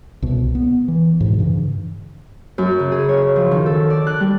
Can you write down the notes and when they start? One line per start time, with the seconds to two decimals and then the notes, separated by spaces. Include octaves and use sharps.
0.22 C2 B2
0.55 B3
0.88 E3
1.21 G#2 B2 F3
1.39 G2 C#3 E3
2.58 F#2
2.79 C#3
2.92 G#4
3.09 C#5
3.36 F3
3.51 D#3
3.66 A4
3.90 D5
4.07 F#6
4.20 G3